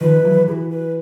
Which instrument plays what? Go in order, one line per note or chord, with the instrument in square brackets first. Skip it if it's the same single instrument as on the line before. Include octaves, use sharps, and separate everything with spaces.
[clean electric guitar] D#3 F3 [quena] B4
[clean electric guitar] E3 F#3
[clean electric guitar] E3 [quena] F#4 G#4
[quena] B4